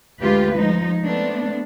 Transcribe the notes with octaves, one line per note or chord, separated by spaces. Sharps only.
D2 G#3 F4 G4 B4
F3 G#3 D#4
A3 B3 C4 D4